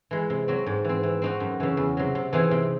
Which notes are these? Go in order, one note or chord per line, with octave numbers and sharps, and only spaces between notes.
E3 G#3
C3
F#3 C4 F#4
G#2
E3 C4
E3
C4 D#4 F#4
F#2
C#3 E3
E2
C3 F#3
C3
E3 C4 D#4 G#4
C3